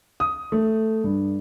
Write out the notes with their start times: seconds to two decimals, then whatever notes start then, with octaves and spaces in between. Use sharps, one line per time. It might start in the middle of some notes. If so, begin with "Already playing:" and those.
0.20 D#6
0.52 A3
1.04 G2